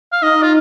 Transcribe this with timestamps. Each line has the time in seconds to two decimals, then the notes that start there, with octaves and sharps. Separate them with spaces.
0.13 F5
0.23 D#4 D#5
0.43 F4